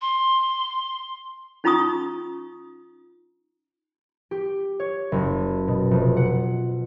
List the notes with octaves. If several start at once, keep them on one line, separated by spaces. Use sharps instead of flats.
C6
C#4 D#4 F4 A#5 C#6 D#6
G4
C#5
F#1
B2
F1
F#5